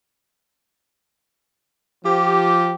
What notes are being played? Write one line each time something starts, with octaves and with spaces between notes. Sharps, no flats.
F3 G4